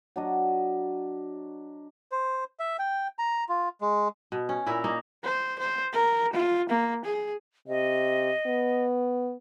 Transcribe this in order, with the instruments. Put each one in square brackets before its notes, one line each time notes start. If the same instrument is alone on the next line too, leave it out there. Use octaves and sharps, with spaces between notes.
[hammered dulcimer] F#3 D4 D#5
[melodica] C5
E5
G5
A#5
F4
G#3
[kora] B2
C#4
A#2 E4 A#4 E5
A#3 D#4
[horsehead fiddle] C5
C5
A#4
F4
A#3
G#4
[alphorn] C3 [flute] D#5
[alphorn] B3